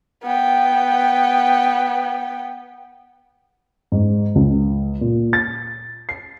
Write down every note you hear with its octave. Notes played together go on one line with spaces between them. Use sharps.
B3 G5
G#2
C#2
A#2
A6
C7